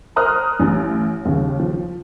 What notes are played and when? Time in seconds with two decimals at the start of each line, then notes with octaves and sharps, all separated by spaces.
0.16 A#4 C5 A#5 D#6 F6 F#6
0.60 A1
1.25 D#2 C#3
1.60 F3